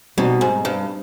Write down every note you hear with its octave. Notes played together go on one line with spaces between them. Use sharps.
B2 G3 C4 D#4
G#2
G2